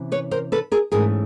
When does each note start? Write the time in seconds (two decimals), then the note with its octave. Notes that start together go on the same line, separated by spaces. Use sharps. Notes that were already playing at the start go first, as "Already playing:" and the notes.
Already playing: C3 E3 C#4
0.12 B4 C#5
0.31 A#4 C5
0.52 A4 B4
0.72 G#4 A#4
0.92 G#2 E3 A3 C#4 G#4 A#4